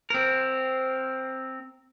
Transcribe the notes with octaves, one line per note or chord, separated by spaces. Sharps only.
C4 A#4